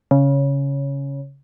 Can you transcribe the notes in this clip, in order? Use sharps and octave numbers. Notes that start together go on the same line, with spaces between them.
C#3